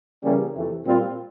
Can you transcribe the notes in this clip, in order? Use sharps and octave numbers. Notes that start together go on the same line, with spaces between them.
C#3 E3 G3 A#3 C#4
F2 C3 E3 A3
A#2 G3 C4 F4